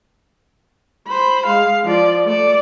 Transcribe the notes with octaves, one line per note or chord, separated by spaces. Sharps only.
C5 B5
G#3 F5
F3 D5
A3 D5